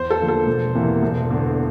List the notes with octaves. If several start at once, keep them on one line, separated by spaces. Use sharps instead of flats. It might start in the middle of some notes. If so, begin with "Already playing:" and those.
Already playing: E2 C5
A4
D3 F3 A#3
A4
E1
E2 C3 E3 A#3
E1
E2 D3